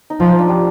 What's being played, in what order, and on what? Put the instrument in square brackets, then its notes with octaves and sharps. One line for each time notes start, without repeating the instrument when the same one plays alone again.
[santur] D#4
[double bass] F3 [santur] F4
[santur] D4
G3